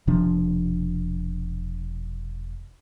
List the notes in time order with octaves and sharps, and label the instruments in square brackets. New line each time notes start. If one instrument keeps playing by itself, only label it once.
[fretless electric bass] E1 C3 F3 D4